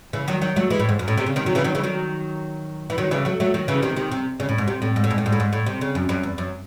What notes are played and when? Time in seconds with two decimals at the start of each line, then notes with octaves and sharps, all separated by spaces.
0.13 C#3 E3
0.28 D#3 F#3
0.42 D#3 F#3
0.56 F#3 A3
0.70 E3 G#3
0.80 A2
0.89 G#2
0.99 F#2
1.08 A2
1.17 C3
1.26 C#3
1.36 C3 D#3
1.46 D#3 F#3
1.55 C#3 E3
1.64 D#3 F#3
1.75 C#3 E3
1.84 D#3 F#3
2.90 E3
2.98 D#3 F#3
3.11 C#3 E3
3.25 F#3 A3
3.40 F#3 A3
3.54 D#3 F#3
3.68 C#3 E3
3.82 C3 D#3
3.96 C3 D#3
4.11 C3
4.40 C#3
4.49 A2
4.58 G#2
4.68 C3
4.82 A2
4.96 G#2
5.04 A2
5.11 G#2
5.18 A2
5.26 G#2
5.32 A2
5.40 G#2
5.53 A2
5.66 C3
5.81 C#3
5.95 F#2
6.09 F#2
6.23 E2
6.38 F#2